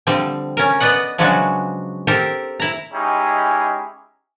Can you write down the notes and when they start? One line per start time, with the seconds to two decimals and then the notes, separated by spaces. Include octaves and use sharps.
0.07 D3 F3 G3 C4
0.57 C#4 A#4
0.80 B3 B4 D5 D#5 F#5
1.18 C#3 F3 F#3 G#3 D4 F#4
2.07 C4 G4 A4 A#4 C5
2.60 E4 A#5
2.93 G#3 C#4 D#4 E4 G4 G#4